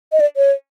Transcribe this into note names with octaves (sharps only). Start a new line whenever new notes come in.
D#5
D5
C#5